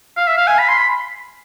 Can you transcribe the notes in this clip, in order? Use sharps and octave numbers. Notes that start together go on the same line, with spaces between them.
F5
E5
F5
G#5
B5
C6
B5